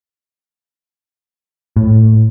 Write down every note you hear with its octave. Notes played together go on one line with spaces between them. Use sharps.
A2